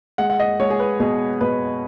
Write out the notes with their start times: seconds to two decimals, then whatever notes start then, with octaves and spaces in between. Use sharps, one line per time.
0.18 G#3 F#5
0.30 F#5
0.40 D#5
0.60 G#3 C#5
0.70 G#4
0.80 B4
1.00 B2 G#4
1.41 B2 B4